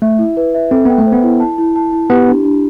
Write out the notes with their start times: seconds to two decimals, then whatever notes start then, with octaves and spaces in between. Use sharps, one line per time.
0.02 A3 E5
0.19 E4
0.37 B4
0.55 E5
0.71 C4 A4
0.85 B3 G5
0.98 A3
1.07 C5
1.12 B3
1.23 E4
1.40 A5
1.58 E4
1.76 A5
1.93 E4
2.10 B3 G4
2.28 D4
2.44 D4